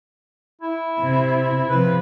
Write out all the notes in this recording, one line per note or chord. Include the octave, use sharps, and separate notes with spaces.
E4
C3
C3 F3 B4